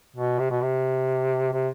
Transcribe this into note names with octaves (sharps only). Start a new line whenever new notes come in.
B2
C3
B2
C3
C3